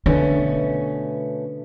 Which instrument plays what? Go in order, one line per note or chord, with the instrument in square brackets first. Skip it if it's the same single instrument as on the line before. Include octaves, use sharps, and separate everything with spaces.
[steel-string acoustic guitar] B2 A3 C#4 [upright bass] D3